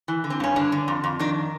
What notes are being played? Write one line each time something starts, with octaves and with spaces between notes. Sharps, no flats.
E3
D3
C4
G2 C#4
D3 D4
D3
F2
F2
D#3 D4